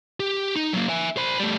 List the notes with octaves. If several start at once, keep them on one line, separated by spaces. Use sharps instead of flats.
G4
D#4
F#3 A#3
E5 G#5
C5 B5
G3 A3